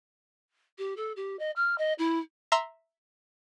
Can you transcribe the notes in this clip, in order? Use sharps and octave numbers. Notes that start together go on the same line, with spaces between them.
G4
A4
G4
D#5
F6
D#5
E4
E5 A#5 C6 E6